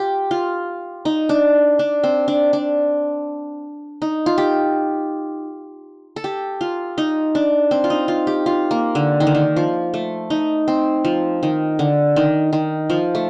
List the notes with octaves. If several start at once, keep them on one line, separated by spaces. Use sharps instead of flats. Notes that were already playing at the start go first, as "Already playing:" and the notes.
Already playing: F4 G4
F4
D#4
D4
D4
C4
D4
D4
D#4
F4
G4
A4
G4
F4
D#4
D4
C4
F4
D#4
F4
G4
F4
A#3
D3
D#3
D3
D#3
F3
A3
D#4
C4
F3
D#3
D3
D#3
D#3
F3
A3